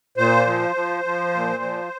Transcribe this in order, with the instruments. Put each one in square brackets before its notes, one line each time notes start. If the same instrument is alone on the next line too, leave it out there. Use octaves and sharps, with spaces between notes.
[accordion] A#2 C5
F3
F3
F3
A#2
F3